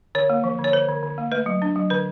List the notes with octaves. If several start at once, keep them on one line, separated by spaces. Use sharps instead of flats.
D3 C#5
A#3
F3
D3
C#5
D3 C5
D3
D3
A#3
A3 B4
F#3
D4
F#3
D3 B4